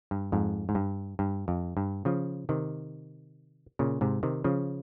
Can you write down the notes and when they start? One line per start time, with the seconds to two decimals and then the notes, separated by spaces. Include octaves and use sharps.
0.11 G2
0.32 F2 G#2
0.69 G#2
0.75 G2
1.19 G2
1.48 F2
1.77 G2
2.05 C#3 F3
2.49 C3 D#3
3.79 A#2 C#3
4.01 G#2 C3
4.23 C3 D#3
4.44 C#3 F3